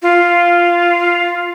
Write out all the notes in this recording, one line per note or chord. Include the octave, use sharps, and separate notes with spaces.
F4